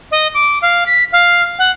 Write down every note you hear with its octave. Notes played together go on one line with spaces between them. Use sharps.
D#5
D6
F5
B6
F5
F#5